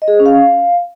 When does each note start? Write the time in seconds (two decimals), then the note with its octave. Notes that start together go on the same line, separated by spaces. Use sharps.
0.02 D#5
0.08 G#4
0.14 C5
0.20 C#4
0.26 F5